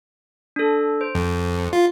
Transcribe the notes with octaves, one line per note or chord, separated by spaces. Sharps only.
D4 A4
C5
F2
F4